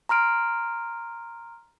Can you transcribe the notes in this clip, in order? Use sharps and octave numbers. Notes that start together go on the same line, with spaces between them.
A#5 C6 F6 D7